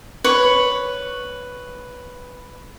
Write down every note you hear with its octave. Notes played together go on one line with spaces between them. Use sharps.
B4 C#5